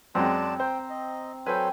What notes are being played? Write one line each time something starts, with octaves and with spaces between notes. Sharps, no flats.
F#2 F#3 G#3 C4 D5 A5
C5 G5 A#5
D#5
F#3 A4 B4 C5 G5 G#5